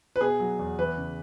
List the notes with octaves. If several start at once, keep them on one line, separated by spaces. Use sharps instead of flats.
B4
B2 G#4
F#3
E2
E3 B4
C#3